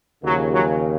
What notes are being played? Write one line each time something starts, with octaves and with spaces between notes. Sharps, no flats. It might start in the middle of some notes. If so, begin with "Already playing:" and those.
D#2 C#3 F3 F#3
F#3